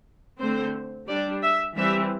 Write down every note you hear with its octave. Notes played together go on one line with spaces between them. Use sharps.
D3 A3 C4 C5
G3 D4 D5
E5
E3 G3 C4 E5